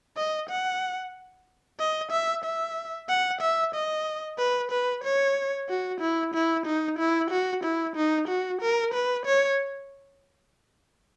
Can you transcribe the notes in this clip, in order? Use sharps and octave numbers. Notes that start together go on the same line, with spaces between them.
D#5
F#5
D#5
E5
E5
F#5
E5
D#5
B4
B4
C#5
F#4
E4
E4
D#4
E4
F#4
E4
D#4
F#4
A#4
B4
C#5